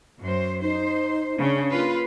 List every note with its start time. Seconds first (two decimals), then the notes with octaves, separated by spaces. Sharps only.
0.21 F#2 C5
0.62 D#4 C5
1.39 C#3 D4
1.70 A#3 F4 B4